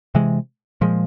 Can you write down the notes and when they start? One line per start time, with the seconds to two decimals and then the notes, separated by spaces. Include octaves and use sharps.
0.15 C3 E3 G#3
0.81 A#2 F3 G#3